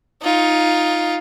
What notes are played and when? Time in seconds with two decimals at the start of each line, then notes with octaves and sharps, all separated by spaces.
0.22 D#4 F4